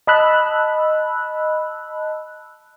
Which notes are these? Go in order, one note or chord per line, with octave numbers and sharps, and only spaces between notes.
D#5 A5 B5 E6 F#6